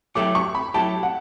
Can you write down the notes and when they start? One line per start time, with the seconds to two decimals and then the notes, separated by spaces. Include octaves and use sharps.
0.15 F#3 A3 E4 G4 D6
0.35 C#6
0.55 B5
0.74 F#3 A3 E4 G4 A5
1.03 F#5